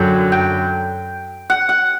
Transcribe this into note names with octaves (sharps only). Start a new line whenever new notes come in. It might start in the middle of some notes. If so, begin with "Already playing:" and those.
Already playing: F#2 D3 F#3 G5
G5
F#5
F#5